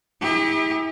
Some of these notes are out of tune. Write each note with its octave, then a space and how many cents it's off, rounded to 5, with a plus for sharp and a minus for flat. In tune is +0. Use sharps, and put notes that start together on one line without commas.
E4 -35 G4 +45